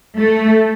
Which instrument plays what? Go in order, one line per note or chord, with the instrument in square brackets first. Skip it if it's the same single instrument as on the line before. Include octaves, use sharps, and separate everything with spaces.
[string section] A3